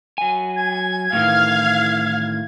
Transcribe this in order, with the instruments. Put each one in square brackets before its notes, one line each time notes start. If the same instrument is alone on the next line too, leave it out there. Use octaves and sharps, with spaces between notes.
[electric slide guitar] F#3 G#5
[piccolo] G#6
[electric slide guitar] A2 D#3 E3 [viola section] F5